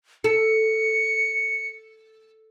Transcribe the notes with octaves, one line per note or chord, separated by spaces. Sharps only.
A4 C#7